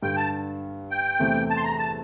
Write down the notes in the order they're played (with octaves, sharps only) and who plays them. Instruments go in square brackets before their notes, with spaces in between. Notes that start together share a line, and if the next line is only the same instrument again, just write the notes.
[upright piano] G2 D3 G3 [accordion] G5
[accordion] A5
G5
[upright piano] E2 C3 E3 A3 C4
[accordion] A5
C6
A#5
A5